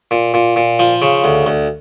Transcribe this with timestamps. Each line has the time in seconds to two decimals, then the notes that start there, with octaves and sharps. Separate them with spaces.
0.11 A#2
0.34 A#2
0.56 A#2
0.79 F3
1.02 C#3
1.24 D2
1.46 D2